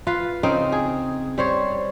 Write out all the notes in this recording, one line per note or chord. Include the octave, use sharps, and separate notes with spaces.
F4 B4 F5
C#3 C4 D#4 G5
G#4
G3 C5 C#5